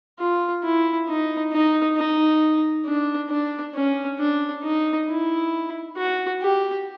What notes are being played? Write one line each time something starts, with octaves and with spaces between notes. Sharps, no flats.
F4
E4
D#4
D#4
D#4
D4
D4
C#4
D4
D#4
E4
F#4
G4